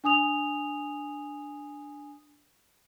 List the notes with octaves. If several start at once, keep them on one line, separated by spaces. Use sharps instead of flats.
D4 G#5 D#6 F7